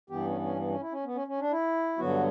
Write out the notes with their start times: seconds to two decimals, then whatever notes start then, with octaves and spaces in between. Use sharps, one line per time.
0.10 G2 E3 B3 G4
0.26 C#4
0.41 C#4
0.57 B3
0.69 C#4
0.81 E4
0.92 C#4
1.04 B3
1.15 C#4
1.27 C#4
1.39 D4
1.51 E4
1.98 G2 D3 F#3 B3 F#4